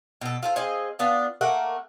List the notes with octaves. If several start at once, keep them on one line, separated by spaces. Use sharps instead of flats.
B2 A4
F4 A4 C5
C4 G#4 D#5 F5
B3 D4 F4
A3 A#3 A#4 F#5